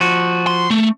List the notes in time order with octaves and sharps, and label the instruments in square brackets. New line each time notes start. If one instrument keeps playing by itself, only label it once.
[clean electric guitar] F3 F#4
[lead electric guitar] C6
A3